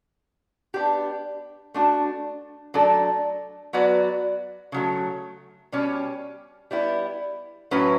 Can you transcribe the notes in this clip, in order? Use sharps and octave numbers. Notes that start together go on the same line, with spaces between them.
B3 D4 G4
A3 D4 F#4
F#3 A3 D4 A4 D5
F#3 B3 F#4 B4 D5
C#3 F#3 A3
B2 G3 C#4 G4
G3 B3 E4
A2 F#3 C#4 E4 B4